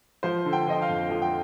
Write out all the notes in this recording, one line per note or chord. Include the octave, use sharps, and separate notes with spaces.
F3 C5
D3
G5
F3 D#5
F5
F2
F3 F5
G5